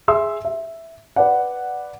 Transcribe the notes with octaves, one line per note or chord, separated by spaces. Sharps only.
G#4 E5 C6 E6
E5
B4 D5 F#5